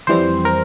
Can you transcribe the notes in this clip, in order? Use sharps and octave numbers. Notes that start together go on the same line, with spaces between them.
F2 E3 G3 C4 C5
A#4